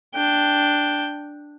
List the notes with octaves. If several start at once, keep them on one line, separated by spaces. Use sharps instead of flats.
D4 G5